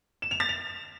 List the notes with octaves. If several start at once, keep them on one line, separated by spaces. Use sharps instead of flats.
E7
F7
A6
F7